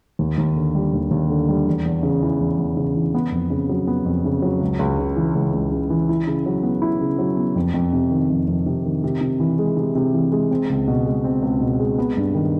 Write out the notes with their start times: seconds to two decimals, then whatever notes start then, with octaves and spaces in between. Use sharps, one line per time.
0.19 D#2
0.38 D#2
0.56 D3
0.75 G3
0.94 D#2
1.11 D#2
1.30 D3
1.49 G3
1.67 E2
1.86 E2
2.03 C#3
2.23 E3
2.40 E2
2.59 E2
2.77 C#3
2.96 E3
3.15 B3
3.32 F2
3.50 C#3
3.69 F#3
3.87 B3
4.05 F2
4.25 C#3
4.42 F#3
4.61 C#2
4.79 C#2
4.98 C#3
5.16 E3
5.35 C#2
5.53 C#2
5.72 C#3
5.90 E3
6.09 E4
6.27 C#3
6.46 F#3
6.63 B3
6.82 E4
7.01 C#3
7.19 F#3
7.37 B3
7.56 F2
7.74 F2
7.93 C3
8.11 D#3
8.30 F2
8.48 F2
8.66 C3
8.85 D#3
9.04 C3
9.21 C3
9.40 E3
9.59 G#3
9.77 C3
9.95 C3
10.14 E3
10.32 G#3
10.51 C4
10.70 C#2
10.88 B2
11.05 G#3
11.24 C4
11.42 C#2
11.61 B2
11.80 G#3
11.98 B3
12.17 G2
12.35 D#3